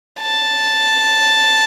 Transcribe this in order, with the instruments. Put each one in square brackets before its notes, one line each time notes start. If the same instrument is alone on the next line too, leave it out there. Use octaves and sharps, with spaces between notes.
[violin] A5